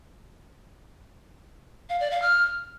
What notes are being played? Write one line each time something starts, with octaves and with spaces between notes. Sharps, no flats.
F5
D5
F5
F6